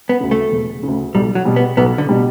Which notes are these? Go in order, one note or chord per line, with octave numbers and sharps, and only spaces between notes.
B3
D2 C#3
A3
E1
D2 C#3
B1 G3
F#3
B2 G3
B3
B1 B3
D3
B2 G3